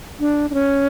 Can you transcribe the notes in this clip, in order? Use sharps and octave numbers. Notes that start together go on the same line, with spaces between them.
D4
D4
C#4